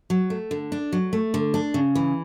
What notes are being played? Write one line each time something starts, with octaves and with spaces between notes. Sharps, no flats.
F#3
A3
D3
D4
F#3
A3
D3
D4
C#3
E3